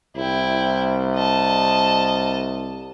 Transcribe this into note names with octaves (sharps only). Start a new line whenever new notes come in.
C2 E4 G5
D#5 A5